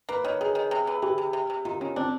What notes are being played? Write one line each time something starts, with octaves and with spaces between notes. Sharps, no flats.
A#3 B4
D#3 C#5
D#3 G#4
D#3
C3
E3
E3 G4
C3
C3
C3
D#3 F4
D#3 C#4
C4 D4